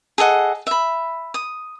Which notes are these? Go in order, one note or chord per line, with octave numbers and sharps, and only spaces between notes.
G#4 A4 D#5 F#5
E5 B5
D#6